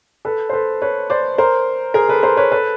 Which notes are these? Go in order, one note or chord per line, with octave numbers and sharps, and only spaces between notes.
A4 B4
C5
A4 B4
B4 C#5
C5 D5
A#4 C5
G#4 A#4
A4 B4
A#4 C5
B4 C#5
A4 B4